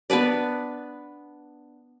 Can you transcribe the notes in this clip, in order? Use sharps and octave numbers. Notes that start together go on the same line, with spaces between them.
B3 D4 B4 D5